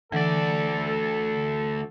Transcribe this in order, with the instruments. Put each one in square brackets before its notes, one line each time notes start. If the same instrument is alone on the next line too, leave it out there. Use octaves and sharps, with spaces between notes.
[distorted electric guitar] D2 D5 [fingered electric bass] D3 [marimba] E3 F#5 [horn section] A4